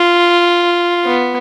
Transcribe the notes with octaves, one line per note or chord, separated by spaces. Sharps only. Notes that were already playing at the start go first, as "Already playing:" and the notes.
Already playing: F4
B3